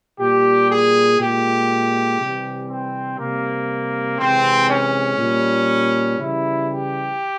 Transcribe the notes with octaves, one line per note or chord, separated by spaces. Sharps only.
A#2 G3 G4
G#4
A#2 G#3 G4
C3 E3 G3
C4
C3 G3 A#3
C3 E3 G#3 C4
C#4
A#2 G3
C#3 E3 G3 E4
G4